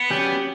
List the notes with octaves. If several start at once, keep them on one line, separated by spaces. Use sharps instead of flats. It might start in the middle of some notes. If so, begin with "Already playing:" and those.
Already playing: B3
F#3 C#4 G4 D5